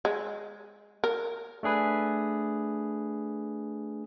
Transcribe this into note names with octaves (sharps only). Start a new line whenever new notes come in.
G#3
A#4
A3 D4 G#4 B4